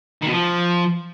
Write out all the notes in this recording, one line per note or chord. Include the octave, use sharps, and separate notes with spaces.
D#3
B2
F3